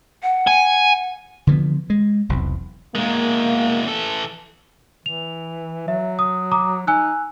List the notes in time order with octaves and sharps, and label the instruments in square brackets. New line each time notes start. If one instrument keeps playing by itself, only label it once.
[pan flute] F#5
[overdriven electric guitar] G#5
[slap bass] D3 E3 F3 B3
G#3
E1 B1 E2 C3
[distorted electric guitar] E2 G#3 [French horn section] A#3
[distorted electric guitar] E3 A4
[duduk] E3 [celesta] F7
[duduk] F#3 [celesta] E5
[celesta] D#6
A#5 D6 D#6
[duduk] D#4 [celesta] G#5 E6 F#6